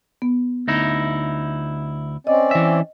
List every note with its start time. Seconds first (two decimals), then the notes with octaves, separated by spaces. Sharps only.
0.22 B3
0.68 D2 D#4 E4
2.27 C4 C#4 D5 D#5
2.51 E3 E5